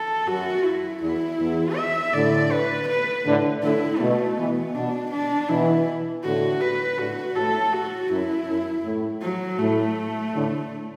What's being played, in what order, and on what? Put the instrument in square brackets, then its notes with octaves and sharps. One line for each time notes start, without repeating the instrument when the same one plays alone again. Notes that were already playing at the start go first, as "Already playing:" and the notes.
Already playing: [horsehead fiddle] A4
[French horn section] F#2 [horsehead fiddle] F#4
[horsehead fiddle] E4
[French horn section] E2 [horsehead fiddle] E4
[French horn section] E2
[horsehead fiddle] E5
[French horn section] A2 D3 [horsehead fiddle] D5
[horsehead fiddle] B4
B4
[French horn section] A2 D3
[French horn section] A2 D3 [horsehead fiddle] E4
[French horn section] B2 [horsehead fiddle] A3
[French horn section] B2 E3 [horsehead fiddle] B3
[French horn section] B2 [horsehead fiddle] D4
[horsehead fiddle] D4
[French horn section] B2 E3 [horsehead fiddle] E4
[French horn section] A2 D3 [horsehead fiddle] F#4
[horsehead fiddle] B4
[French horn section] A2 D3 [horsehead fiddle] F#4
[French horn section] A2 [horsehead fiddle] A4
[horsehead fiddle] F#4
[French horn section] F#2 [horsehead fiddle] E4
[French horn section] F#2
A2
[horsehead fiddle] F#3
[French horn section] A2 [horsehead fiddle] A3
[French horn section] A2 D3